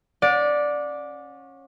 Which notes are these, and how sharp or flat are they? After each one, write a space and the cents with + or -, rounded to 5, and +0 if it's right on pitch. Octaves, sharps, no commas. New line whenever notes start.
C#4 -20 D5 +0 F#5 -35